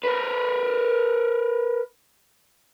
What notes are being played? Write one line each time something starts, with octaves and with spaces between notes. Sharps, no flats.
A#4 B4